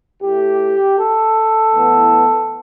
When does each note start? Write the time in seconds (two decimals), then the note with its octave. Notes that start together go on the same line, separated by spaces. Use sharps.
0.22 A2 A3 G4
0.99 A4
1.75 A2 E3 B3